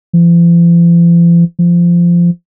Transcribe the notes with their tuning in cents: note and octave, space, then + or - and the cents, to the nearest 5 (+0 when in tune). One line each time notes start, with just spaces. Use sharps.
F3 -45
F3 -15